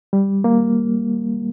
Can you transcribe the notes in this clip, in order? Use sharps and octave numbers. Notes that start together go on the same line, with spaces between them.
G3
A#3